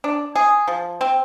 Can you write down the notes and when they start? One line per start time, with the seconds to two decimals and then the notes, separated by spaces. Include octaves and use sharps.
0.04 D4
0.36 G#4
0.68 F3
1.01 C4